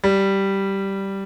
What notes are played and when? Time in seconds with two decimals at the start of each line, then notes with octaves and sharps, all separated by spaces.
0.04 G3